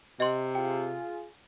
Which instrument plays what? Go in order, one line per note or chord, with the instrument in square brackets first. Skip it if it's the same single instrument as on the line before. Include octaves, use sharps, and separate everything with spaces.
[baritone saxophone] C3 [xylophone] D#5 C6
[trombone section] F4 G#4 [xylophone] G5